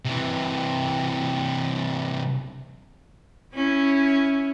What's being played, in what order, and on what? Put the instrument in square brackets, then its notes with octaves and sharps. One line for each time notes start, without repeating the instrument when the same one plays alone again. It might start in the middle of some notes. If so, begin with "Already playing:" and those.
[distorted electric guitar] C3 E3
[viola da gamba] C#4 E4